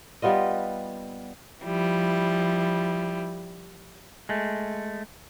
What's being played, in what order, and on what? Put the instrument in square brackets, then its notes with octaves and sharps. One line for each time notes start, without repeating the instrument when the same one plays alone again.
[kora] G3 B3 F4 D#5
[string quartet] F3 G3 E4
[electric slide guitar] G#3 A3